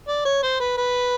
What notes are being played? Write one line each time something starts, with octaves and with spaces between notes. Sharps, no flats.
D5
C#5
C5
B4
B4